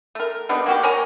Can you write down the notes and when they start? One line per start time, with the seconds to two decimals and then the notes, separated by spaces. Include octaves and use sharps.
0.15 A3 A#4
0.49 G3 B3 D4 D#4
0.66 A#3 F#4 G4
0.83 A#4 C#5 G#5 A#5